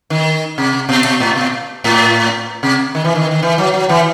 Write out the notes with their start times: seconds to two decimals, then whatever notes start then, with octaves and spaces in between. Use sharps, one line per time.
0.10 D#3
0.58 C3
0.89 B2
1.05 B2
1.20 A2
1.36 B2
1.84 A2
2.63 C3
2.95 D#3
3.04 E3
3.15 D#3
3.31 D#3
3.43 E3
3.58 F#3
3.74 F#3
3.89 E3